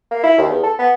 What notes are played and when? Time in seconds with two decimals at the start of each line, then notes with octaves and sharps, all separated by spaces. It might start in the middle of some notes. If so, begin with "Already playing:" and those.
0.11 A#3
0.23 E4
0.38 D#2
0.50 E2
0.63 A4
0.79 B3